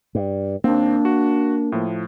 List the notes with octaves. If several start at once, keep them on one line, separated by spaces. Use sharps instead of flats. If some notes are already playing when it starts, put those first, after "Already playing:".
G2
D#2 A#3 C4 D4
F#4
A2 F3